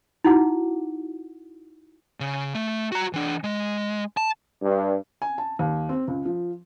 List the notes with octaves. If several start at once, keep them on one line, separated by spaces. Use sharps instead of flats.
D#4 E4 F#4 F#5 D6
C#3
A3
F#4 A#5
E3 D4
G#3
A5
G2
G#5
A5
D#2
C4
C#2
F3